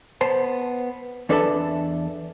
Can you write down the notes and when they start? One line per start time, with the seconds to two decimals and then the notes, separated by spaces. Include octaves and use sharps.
0.21 B3 C5 A5
1.29 E2 D4 A4 B4 E5 A5